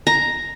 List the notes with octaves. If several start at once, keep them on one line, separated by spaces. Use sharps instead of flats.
A#5